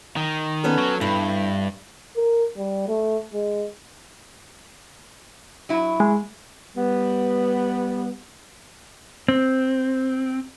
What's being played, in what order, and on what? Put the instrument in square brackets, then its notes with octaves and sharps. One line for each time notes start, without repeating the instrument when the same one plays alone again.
[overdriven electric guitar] D#3
[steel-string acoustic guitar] B3 C#4 A4
[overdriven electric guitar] F#3
[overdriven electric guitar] G2 [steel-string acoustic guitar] E4
[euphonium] A#4
G3
A3
G#3
[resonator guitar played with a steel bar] F#3 E4
[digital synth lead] G#3
[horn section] G3 B3
[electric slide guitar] C4